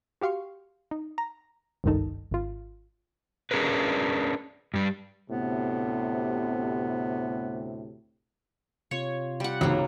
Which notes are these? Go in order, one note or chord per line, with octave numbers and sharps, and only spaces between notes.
F#4 G4 F5 C6 C#6
D#4
A#5
G#1 C#2 G2 D#3 D#4 A4
G#1 F4
C#4 D4 G#4 A#4 B4
G2 G3
D2 A2 C3 B3
C3 F4 C#5
G3 F#5
C#2 G#2 F#3 A#3